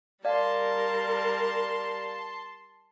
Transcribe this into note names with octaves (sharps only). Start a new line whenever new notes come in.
G3 A#4 D5 F5 A5 C6